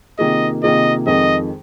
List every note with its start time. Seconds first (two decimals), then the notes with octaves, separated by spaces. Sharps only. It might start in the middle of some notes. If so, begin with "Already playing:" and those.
0.19 C3 D#3 A#3 F4 G#4 D#5
0.63 C3 D#3 A#3 F4 G#4 D#5
1.07 F2 D#3 G#3 D#5